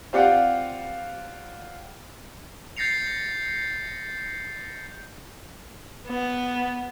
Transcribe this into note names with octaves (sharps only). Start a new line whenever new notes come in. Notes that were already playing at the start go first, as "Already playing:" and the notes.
C4 F4 G4 D5 F5 F#5
G6 A6 A#6 C7 C#7 F7
B3